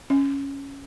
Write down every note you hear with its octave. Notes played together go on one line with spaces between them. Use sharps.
C#4